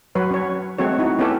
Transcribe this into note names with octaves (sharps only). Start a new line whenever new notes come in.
F#3 B4 C#5
C#4 C#5
G#3 A3 C4 F#4 C#5
D#4 E4 F#4
B3 C#4 E4 G4 A4